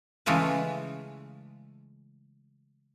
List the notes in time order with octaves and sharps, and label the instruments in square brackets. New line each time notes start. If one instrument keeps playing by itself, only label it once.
[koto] C#3 E3 G#3 A3 F4 B4